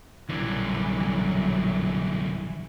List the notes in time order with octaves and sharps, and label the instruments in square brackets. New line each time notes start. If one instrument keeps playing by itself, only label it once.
[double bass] A#1 B2 [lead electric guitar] F#2 D3 [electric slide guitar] E3 [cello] F#3 G3